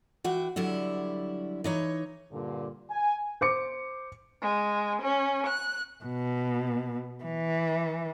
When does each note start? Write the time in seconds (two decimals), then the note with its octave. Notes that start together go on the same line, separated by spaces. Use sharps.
0.24 E3 F#4 F#5 G5
0.56 D3 F#3 G3 E4
1.64 E3 D#4 C#5
2.31 G2 A#2 D3
2.90 G#5
3.41 C5 D6 C#7
4.40 G#3
5.01 C#4
5.46 F#6
6.04 B2
7.24 E3